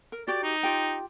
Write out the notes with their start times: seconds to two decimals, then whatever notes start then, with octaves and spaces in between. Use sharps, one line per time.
0.12 A#4
0.28 F#4 G4 D5
0.43 D#4
0.63 F4 G4 G5